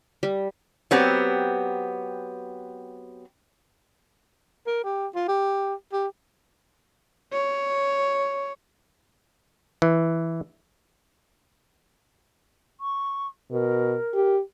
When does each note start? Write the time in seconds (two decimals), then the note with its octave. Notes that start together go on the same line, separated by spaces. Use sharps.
0.23 G3
0.91 F#3 B3 C4 G4
4.67 A#4
4.84 G4
5.15 F4
5.28 G4
5.93 G4
7.33 C#5
9.82 E3
12.81 C#6
13.51 B2 A#4
14.14 G4